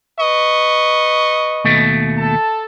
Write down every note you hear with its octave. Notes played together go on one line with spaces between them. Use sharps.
B4 D#5 C#6
D#2 B2 A3
A4 A5